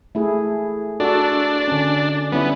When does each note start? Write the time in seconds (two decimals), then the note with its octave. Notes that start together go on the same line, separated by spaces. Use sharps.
0.15 A3 E4 G#4
1.00 D4 F#4 A4
1.68 D3 C#4
2.32 G3 B3 C#4 E4